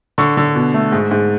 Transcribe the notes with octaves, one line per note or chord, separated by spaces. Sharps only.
D3 C#6
D3
B2
A3
G#2
G#2